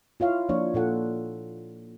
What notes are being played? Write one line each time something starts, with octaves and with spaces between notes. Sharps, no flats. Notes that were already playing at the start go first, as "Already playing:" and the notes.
E4 F4 C#5 F5
F3 A#3 D4 C#5
A#2 F4 A4 F#5